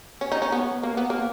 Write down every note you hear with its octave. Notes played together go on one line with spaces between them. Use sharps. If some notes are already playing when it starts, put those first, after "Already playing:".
C#4
D#4
C#4
B3
A#3
B3
A#3